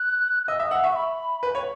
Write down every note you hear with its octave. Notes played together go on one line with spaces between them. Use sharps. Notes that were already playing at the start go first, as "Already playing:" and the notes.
Already playing: F#6
D#5 E6
E5 D#6
F#5 E6
E5 C#6
B5
B4
C#5